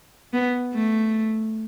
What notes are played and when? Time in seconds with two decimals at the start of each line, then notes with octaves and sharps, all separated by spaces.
0.33 B3
0.73 A3